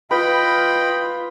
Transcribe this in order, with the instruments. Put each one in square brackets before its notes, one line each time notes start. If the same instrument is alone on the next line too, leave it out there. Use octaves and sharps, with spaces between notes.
[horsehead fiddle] F4 [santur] B4 [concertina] D#5 G5 B5